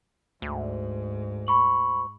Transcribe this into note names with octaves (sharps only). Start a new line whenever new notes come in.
D2 G#2
B5 C#6 F#7